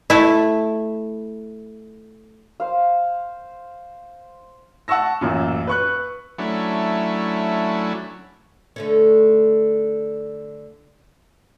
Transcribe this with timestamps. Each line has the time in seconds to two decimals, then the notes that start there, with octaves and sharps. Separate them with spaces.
0.10 A3 E4
2.60 C5 F5
4.88 F#5 A5 C#6 E6 A#6
5.21 A1 F#2 A#2
5.67 B4 C#6 F#6
6.38 F#3 A3 C#4 D4 E4
8.76 D3 A3 C#4